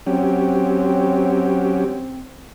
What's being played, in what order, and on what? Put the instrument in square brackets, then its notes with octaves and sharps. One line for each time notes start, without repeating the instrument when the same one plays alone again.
[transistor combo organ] F#3 C#4 G4 [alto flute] C4